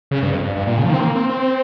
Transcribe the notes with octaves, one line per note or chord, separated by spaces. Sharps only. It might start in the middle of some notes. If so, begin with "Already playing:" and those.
C#3
G2
F2
G2
G2
A#2
C#3
F3
D#3
C4
A#3
C4
C4